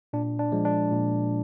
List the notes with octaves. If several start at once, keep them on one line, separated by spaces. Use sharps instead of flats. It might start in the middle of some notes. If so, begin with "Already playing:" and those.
A#2 D4
D4
F3 G#3
D4
A#2